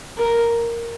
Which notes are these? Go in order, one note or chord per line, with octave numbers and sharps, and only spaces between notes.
A#4